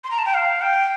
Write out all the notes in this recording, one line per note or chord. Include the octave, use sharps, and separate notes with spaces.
C6
A#5
A5
G5
F5
G5